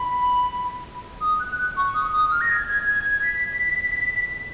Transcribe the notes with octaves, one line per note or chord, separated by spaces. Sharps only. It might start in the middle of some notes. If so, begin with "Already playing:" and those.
Already playing: B5
D#6
F#6
F#6
C#6
D#6
D#6
F6
A#6
G#6
G#6
G#6
G#6
B6